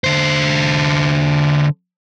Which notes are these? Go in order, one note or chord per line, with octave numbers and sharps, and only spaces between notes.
D3 C5